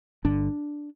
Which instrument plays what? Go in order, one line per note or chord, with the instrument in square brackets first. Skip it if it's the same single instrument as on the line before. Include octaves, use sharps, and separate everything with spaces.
[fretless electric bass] G1 G2 D3 D4